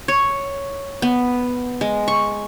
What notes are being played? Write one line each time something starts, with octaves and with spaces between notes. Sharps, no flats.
C#5
B3
G#3
C#6